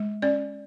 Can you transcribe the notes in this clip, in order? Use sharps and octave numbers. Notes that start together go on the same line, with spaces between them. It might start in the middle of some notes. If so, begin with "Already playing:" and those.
Already playing: G#3
C#4 D5